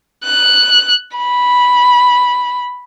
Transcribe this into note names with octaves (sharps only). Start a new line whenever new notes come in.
F#6
B5